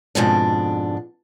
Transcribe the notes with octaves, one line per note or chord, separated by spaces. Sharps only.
F2 G#2 B2 D4